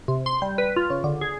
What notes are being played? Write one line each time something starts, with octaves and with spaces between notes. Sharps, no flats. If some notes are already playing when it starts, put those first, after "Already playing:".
C3
C6
G3
B4
F4
C#3
D3
G#4